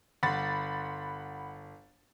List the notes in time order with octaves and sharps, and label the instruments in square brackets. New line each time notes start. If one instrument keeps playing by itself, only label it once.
[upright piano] G1 C6 [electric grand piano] F#5 B5 A6